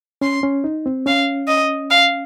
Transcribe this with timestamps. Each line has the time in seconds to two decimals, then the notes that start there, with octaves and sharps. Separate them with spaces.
0.21 C#4 C6
0.43 C#4
0.64 D#4
0.86 C4
1.06 C#4 F5
1.48 D#5
1.90 F5